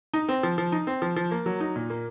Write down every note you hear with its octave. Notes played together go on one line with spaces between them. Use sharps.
D#4
C4
F3
F3
D#4
C4
F3
F3
A#3
F#3
D#4
A#2
A#3